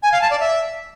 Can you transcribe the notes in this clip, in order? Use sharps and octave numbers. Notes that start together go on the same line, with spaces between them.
G#5
F5
A5
D5
E5